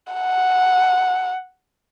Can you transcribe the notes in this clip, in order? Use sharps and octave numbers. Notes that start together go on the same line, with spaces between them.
F#5